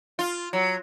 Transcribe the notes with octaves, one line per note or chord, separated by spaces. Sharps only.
F4
F#3